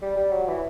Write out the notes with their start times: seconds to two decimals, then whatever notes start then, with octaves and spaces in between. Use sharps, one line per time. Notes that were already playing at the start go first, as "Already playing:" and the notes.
0.02 G3
0.17 G3
0.32 F#3
0.48 E3